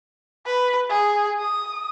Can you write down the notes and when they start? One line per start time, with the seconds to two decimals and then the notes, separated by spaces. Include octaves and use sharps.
0.46 B4
0.89 G#4
1.39 D#6